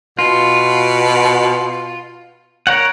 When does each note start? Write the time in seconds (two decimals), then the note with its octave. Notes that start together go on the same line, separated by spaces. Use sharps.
0.19 B2 F4
2.67 A#4 C#5 F#5